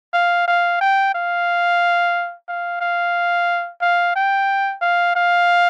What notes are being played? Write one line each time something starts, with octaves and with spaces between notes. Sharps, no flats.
F5
F5
G5
F5
F5
F5
F5
G5
F5
F5